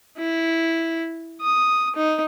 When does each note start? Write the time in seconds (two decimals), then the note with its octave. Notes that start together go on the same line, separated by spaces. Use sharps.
0.18 E4
1.41 D#6
1.96 D#4